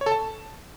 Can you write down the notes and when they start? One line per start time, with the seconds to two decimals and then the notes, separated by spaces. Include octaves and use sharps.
0.01 C#5
0.06 A4
0.12 A5